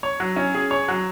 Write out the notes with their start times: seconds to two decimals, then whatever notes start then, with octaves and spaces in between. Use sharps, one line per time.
0.03 C#5
0.20 F#3
0.36 C#4
0.54 G#4
0.71 C#5
0.88 F#3